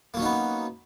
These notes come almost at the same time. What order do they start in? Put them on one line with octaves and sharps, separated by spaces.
A#3 F#3 C#4 D#4 B3